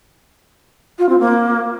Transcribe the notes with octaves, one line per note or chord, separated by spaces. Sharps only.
F4
C4
A#3